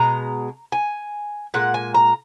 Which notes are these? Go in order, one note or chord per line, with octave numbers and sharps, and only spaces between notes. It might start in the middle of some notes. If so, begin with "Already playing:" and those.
Already playing: B2 G#3 A#5
G#5
A#2 G#3 F#5
G#5
A#5